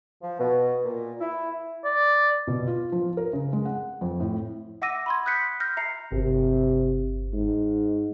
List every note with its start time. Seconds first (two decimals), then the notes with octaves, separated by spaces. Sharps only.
0.22 F3
0.39 B2
0.84 A#2
1.20 E4
1.84 D5
2.47 B2
2.67 F4
2.92 F3
3.17 A#4
3.33 C#3
3.53 G#3
3.65 F#5
4.01 F2
4.20 A2
4.82 E5 F#5 D6 E6 A#6 D#7
5.06 B5 C6 G#6
5.26 D#6 F#6 G6 B6 C#7
5.60 F6 G6 A#6
5.77 E5 A#5 C7 C#7
6.12 G1 C3
7.33 G#2